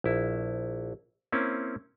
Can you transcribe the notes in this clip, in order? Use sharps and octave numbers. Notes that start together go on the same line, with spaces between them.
A#1 E4
A#3 C4 C#4 E4